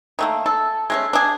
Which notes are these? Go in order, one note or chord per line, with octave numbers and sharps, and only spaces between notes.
D#3 A3 A#3
A4
G#3 A3 C#4
D4 G#4